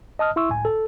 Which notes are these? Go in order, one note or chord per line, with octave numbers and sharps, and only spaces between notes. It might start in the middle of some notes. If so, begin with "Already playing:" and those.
D#5 A5 D#6 F6
E4 E5 C6 C#6 E6
C#2 A2 G#5
A4